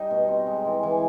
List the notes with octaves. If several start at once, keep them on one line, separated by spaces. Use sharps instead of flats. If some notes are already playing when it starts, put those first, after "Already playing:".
Already playing: G3 D#4
B2
C4
G#3
E3
E3